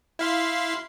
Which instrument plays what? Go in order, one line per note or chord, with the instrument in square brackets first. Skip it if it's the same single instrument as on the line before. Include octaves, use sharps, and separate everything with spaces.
[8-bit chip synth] E4 F5 C6